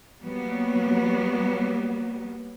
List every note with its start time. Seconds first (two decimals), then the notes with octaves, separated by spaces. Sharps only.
0.21 F#3 G3 A#3 B3